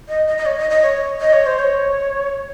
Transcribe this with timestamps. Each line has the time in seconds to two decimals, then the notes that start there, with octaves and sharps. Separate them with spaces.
0.09 D#5
0.27 D#5
0.38 D#5
0.46 C#5
0.58 D#5
0.70 D#5
0.82 C#5
1.20 D#5
1.33 C#5
1.46 C5
1.59 C#5